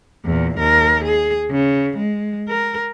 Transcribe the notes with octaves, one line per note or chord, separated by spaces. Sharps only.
E2 A#2
D#2 A#4
G#4
C#3
G#3
A#4